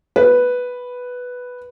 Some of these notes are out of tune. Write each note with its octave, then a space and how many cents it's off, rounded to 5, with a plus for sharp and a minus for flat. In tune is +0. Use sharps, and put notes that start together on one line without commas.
B4 +0